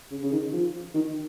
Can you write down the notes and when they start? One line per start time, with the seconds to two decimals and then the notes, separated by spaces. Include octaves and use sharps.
0.12 C#3
0.23 C#3
0.32 D#3
0.53 F3
0.94 D#3